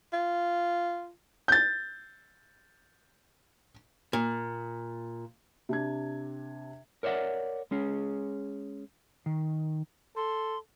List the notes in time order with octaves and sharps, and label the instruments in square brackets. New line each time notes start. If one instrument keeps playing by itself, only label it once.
[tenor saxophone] F4
[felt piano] G6 A6
[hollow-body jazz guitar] A#2
[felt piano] C3 D4 G#6
[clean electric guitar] A#4 C#5 D5 E5 F#5
G#3 C#4 G#4
D#3
[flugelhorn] A4 [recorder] C6